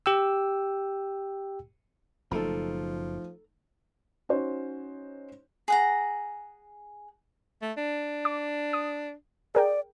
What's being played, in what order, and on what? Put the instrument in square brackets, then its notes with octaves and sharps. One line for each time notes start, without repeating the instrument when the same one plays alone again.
[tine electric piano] G4 G5 E6
[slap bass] F#1 B2 [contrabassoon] F3 [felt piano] A3 D#4 [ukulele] A4 A#5
[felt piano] C#4 D#4 F#4 C5 C#5
[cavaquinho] G#4 F#5 A#5
[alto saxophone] A3
D4
[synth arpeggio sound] D6
D#6
[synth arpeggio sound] G#4 A#4 G5 [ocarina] D5